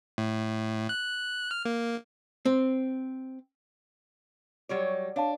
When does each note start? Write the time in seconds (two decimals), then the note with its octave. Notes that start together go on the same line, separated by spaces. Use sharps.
0.18 A2
0.89 F#6
1.51 F6
1.65 A#3
2.46 C4
4.69 F#3 G3 C#5
5.16 D4 C#5 F5 A5